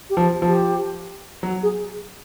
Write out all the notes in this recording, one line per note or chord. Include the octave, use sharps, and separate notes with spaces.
G4
F3
F3
G4
F#3
G#4